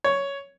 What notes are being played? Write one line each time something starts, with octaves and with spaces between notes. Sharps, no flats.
C#5